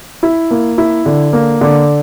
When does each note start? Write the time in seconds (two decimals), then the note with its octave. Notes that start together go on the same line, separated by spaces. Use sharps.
0.23 E4
0.51 A#3
0.78 E4
1.06 D3
1.33 A#3
1.61 D3